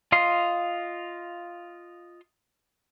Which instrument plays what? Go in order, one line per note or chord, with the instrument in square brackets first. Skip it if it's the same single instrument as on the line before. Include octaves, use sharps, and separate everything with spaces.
[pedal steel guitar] F4 D#5 F5 C6